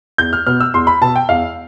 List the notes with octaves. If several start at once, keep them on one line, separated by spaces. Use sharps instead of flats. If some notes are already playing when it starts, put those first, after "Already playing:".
E2 G6
F6
B2 B3 F6
E6
E2 C6
B5
B2 B3 A5
G5
E2 F5